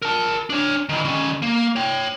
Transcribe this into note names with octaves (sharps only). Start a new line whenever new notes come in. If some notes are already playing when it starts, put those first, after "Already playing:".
A#4 A5
D4 C#5
D#3 E4
D#3 C#4
A#3
C#5 G5